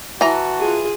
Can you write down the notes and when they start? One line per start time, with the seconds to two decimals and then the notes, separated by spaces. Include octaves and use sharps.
0.21 E3 F#4 A5 A#5
0.59 F4 G#4